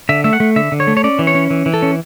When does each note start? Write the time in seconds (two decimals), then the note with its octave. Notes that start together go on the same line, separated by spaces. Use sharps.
0.09 D3 E5
0.24 A3 E5
0.33 F#5
0.40 A3
0.56 D3 E5
0.72 D3
0.80 C#5
0.87 A3
0.97 C#5
1.04 C#4 D5
1.19 E3
1.27 C#5
1.35 C#4
1.50 E3
1.66 E3
1.74 A4
1.82 C#4